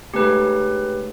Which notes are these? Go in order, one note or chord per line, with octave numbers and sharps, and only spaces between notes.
G#2 C#3 A3 G4 B4